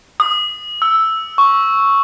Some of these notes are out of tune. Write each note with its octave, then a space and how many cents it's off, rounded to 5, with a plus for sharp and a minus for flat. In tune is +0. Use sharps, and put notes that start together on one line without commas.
D#6 -20
E6 -5
C#6 +0